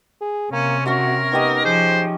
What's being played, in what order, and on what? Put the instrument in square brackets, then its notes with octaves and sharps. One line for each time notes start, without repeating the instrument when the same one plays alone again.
[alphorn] G#4
[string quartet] C3 [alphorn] A#3 [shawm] C#4
[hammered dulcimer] C#4 C#5 E5 [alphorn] F#4 [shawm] A#4
[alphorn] B3 [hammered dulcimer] D#4 G4 D#5
[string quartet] F3 [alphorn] G#4 [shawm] C5